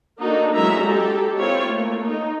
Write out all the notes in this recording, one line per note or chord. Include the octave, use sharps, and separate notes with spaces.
A#3 D4 D#4 F#4 A4
F#3 G#3 C#4 E4 E5 A#5
G#3 G4 A4
C4 E4 F4 C#5
A3 A#3
D#4